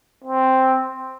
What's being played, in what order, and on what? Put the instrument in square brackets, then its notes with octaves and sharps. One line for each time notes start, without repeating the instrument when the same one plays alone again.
[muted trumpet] C4